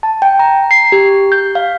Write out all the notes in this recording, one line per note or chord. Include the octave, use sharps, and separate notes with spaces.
A5
G5
A#5
C7
G4
G6
F5